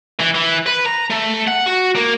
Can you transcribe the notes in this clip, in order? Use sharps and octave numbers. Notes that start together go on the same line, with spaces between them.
E3
E3
B4
A#5
A3
F#5
F#4
A#3